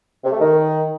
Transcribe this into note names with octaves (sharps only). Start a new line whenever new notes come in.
C3
A3
D#3